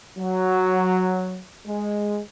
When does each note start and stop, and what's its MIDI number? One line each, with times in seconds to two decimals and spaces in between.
0.18 1.41 54
1.67 2.20 56